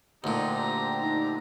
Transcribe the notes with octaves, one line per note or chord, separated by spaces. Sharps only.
D2 A#2 C4 D4 D#4 G4
A#5
D#4 A#5